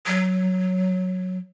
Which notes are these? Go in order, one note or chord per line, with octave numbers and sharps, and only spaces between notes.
F#3